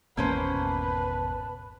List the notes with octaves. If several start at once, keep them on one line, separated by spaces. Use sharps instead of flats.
G#1 E2 B2 A#3 C#4 B4 C5 A5